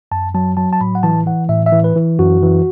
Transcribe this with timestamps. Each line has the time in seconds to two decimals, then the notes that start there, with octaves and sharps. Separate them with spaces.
0.12 F#2 A5
0.35 F#3 A5
0.57 F#3 A5
0.73 A5
0.81 A2 B5
0.95 F#5
1.03 E3 A5
1.26 E3 F#5
1.49 A2 E5
1.66 E5
1.72 E3
1.84 B4
1.96 E3
2.19 F#2 F#4
2.42 E3